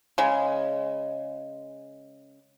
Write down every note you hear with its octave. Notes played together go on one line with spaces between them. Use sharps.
C#3 G#3